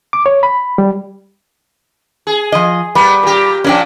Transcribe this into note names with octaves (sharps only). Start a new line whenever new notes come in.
D6
C#5
B5
G3
G#4
F3 D#5
G3 A#3 B3
A#2 G4
A#2 F3 C#4 D4 G4